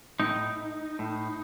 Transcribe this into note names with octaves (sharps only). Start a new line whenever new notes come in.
A2 D#4
A2